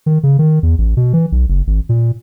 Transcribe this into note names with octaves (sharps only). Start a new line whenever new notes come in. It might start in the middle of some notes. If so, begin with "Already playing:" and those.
D#3
C#3
D#3
E2
A1
B2
E3
B1
F#1
G#1
A#2